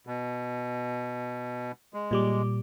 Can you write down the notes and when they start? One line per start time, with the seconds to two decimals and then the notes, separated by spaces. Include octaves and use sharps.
0.07 B2
1.94 G#3
2.11 A#2 G3 D6